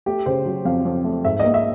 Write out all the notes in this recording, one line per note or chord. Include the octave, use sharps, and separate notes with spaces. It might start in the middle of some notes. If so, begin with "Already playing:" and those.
A3 G4
C#3 C5
F#3
F2 F5
F2
A3
G#2 E5
A#3 D#5
E5